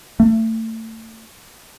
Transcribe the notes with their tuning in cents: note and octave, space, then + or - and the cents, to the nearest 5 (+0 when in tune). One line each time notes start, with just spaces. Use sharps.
A3 +30